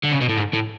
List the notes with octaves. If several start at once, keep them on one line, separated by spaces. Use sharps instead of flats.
D3
C#3
B2
A2
G#2
A2